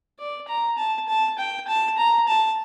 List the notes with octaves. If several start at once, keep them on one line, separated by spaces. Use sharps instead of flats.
D5
A#5
A5
A5
G5
A5
A#5
A5